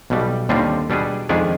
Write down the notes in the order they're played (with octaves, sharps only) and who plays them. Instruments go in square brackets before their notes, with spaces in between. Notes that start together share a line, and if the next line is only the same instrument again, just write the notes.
[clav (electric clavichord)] B1 B2 G3
D#2 D3 G3 C4 F4
B2 G3 D4 G#4
F2 D#3 G#3 D4 G#4